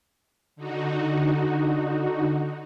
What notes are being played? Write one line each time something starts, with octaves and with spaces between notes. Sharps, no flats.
D3 D#4 F#4